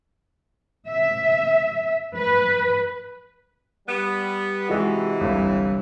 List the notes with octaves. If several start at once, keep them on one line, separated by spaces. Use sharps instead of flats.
E5
B4
G3 B3
C3 E3 G#3 F#4
G1 C2